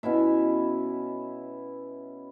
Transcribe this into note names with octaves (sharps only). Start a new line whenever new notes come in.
B2 C#4 E4 E5